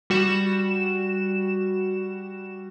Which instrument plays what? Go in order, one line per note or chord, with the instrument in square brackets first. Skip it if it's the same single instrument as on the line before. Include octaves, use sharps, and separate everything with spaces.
[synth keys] G3 F#4 E7